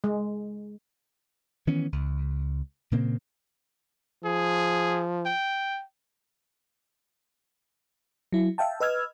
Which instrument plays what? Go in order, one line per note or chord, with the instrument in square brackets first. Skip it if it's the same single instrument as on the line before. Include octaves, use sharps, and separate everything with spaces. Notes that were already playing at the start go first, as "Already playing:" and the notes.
[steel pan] G#3
[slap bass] D#3 E3 B3 C#4
C#2
A#2 C#3 A#3 C4
[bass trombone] F3 [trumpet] G#4
[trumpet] G5
[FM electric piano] F#3 E4
E5 F5 G5 A5
B4 D#5 E6 F6 G#6